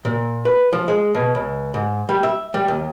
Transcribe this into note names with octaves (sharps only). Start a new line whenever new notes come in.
A#2
B4
F3
G#3
B2
C#2
G#2
G3
E5
G3
D#2